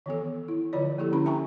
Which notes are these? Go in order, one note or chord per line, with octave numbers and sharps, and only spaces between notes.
D#3 E3 B3 A4
E4
D3 F3 F4 C#5 D5
A#3 E4 G4 A4
D3 C#4 D4 E4 B5
E5 G5 G#5 A#5 C#6